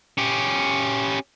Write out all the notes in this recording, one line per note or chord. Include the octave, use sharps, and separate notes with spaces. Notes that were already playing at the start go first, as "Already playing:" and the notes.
C#4 G4